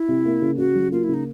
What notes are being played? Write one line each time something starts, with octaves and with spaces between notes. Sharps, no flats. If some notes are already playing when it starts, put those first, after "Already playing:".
Already playing: E4
C3
A#3
C#3
C#3 F#4
F#3
A#3 F4
E4
C#3
D#4